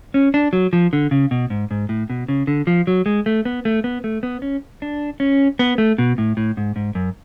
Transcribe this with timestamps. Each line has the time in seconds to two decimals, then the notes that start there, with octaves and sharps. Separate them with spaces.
0.14 C#4
0.34 D4
0.53 F#3
0.73 F3
0.93 D3
1.11 C#3
1.31 B2
1.50 G#2
1.71 G#2
1.89 A2
2.10 B2
2.28 C#3
2.47 D3
2.67 F3
2.87 F#3
3.06 G#3
3.26 A3
3.45 B3
3.65 A3
3.84 B3
4.04 A3
4.23 B3
4.42 C#4
4.82 D4
5.20 C#4
5.59 B3
5.78 A3
5.98 B2
6.18 A2
6.37 A2
6.57 G#2
6.76 G#2
6.95 F#2